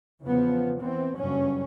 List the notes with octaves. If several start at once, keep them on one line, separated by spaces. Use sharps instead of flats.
E2 C#3 F3 B3
E3 B3 C4
F#1 G2 F#3 C#4